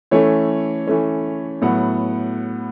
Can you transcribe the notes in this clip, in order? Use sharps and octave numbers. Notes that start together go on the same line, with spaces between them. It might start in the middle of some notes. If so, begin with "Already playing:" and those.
E3 A3 C#4 C#5
E3 A3 C#4
A2 F#3 B3 F#5